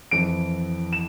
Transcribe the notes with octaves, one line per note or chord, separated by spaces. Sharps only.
F2 E3 D7
E7